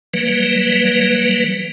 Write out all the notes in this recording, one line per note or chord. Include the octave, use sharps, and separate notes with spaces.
E3 F#3 G3 A#3 B4